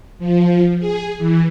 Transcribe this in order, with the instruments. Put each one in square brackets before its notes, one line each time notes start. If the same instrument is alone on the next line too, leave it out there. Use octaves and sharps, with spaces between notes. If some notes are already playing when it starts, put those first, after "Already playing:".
[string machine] F3
G#4
E3